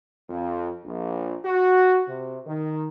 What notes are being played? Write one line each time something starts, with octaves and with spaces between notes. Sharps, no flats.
F2
A#1
F#4
C3
D#3